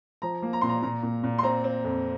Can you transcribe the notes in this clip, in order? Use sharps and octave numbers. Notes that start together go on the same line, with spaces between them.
F3 A#5
A#3
A#5
A#2 C6
A#5
A#2 A#5
A#2
A#2
C6
C4 A#5
C4
F2